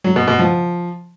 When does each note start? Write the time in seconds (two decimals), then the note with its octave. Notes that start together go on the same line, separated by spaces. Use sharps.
0.04 F#3
0.16 B2
0.28 B2
0.39 F3